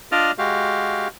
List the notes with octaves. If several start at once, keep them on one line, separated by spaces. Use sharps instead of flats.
D4 F4 D5 D#5 F6
G#3 F#4 G4 F5